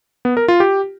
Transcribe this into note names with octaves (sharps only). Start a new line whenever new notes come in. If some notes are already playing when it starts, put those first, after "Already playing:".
B3
A#4
F4
G4